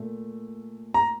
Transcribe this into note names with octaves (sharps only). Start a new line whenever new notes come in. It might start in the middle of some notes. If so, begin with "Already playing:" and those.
Already playing: A#2 A3
A#5